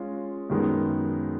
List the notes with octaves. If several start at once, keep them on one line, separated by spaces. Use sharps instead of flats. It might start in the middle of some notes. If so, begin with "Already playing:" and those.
Already playing: G#3 C#4 F4
F#2 D#3 G#3 B3